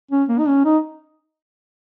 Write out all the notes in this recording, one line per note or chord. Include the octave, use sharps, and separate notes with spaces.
C#4
A#3
D#4
C#4
D#4